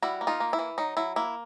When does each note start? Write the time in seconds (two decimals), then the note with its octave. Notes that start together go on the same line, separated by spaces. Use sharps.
0.02 G3 E4 F#4
0.21 A#3
0.27 D#4 F4
0.40 A#3
0.53 E4
0.59 E3
0.78 F#3 D#4
0.97 F#3 E4
1.16 A#3 E4